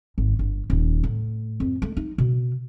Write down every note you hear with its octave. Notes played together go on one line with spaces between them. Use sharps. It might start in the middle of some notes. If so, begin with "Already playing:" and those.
G#1
G1
D#1
A2
F2
A3
D#4
B2